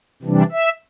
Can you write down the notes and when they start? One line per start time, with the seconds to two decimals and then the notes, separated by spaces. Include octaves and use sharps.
0.23 C3 E3 G3 D4
0.52 E5